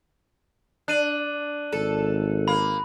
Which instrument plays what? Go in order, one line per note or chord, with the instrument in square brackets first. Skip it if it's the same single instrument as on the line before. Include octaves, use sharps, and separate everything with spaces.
[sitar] D4 [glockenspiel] F#6 D#7 F#7
[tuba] G#1 [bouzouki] A4
[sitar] A#3 [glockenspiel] B5